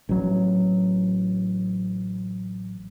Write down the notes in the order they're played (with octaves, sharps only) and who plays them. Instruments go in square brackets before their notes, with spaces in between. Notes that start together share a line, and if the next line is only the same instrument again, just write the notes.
[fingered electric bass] A1 F#3